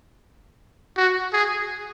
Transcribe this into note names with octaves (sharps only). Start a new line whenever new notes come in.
F#4
G#4